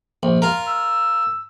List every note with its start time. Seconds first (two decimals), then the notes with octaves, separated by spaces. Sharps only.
0.23 A#1
0.42 F4 A#4
0.68 E6